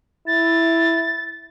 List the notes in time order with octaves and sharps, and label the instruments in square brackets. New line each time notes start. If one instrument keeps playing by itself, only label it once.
[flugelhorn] E4 [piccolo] A6